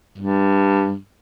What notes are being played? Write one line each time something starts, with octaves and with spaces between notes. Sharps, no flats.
G2